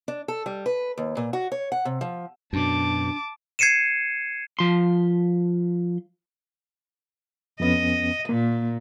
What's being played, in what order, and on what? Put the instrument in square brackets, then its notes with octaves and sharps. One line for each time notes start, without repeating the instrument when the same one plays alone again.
[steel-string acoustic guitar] D4
A4
G3
B4
D#2
A#2
F#4
C#5
F#5
C3
F3
[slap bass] F#2 B2 [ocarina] D4 [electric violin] A5 D6
[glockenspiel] G#6 C7 C#7 D#7 E7
[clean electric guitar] F3 C6
[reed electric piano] F2 B3 C#4 [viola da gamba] D#5
[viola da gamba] A#2 [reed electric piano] A#3